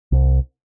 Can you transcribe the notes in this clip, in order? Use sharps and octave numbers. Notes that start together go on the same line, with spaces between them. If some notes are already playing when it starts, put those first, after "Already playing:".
C2